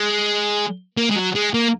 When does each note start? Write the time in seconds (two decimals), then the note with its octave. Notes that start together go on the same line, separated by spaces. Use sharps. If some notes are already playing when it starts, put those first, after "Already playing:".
Already playing: G#3
0.97 A#3
1.10 G#3
1.16 F#3
1.35 G#3
1.54 A#3